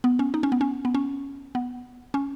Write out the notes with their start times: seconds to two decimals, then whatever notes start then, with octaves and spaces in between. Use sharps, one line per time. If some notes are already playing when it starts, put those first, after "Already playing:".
0.04 B3
0.19 C#4
0.34 D#4
0.43 C#4
0.52 B3
0.61 C#4
0.85 B3
0.95 C#4
1.55 B3
2.14 C#4